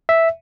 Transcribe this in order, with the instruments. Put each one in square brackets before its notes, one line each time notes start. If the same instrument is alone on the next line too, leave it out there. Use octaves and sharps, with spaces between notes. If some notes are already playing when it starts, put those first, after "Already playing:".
[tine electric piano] E5